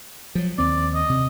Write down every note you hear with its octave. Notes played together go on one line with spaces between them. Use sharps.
F3 F#3
D#2 C4 D5
D#5
C3